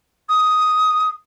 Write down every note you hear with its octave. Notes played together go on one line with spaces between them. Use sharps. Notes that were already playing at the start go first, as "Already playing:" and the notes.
D#6